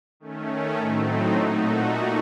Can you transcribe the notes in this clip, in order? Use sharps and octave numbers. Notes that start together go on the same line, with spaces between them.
D#3 A3 C#4
A2 F#3 A3 C4 D#4
A#2 A3 D#4 F#4